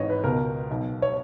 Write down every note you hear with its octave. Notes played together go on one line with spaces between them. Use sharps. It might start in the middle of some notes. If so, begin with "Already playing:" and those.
Already playing: G#1 G#2 E3 C#5 D#5
B4
C#2 B2 A#4
B1 B2
C#5